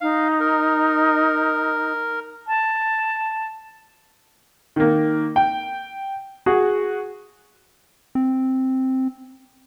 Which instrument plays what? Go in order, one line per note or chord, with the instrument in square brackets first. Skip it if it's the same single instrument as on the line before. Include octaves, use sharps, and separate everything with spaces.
[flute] D#4 [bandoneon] F5
[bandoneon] A#4
[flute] A5
[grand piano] D#3 A#3
G5
F#4 G#4
[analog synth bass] C4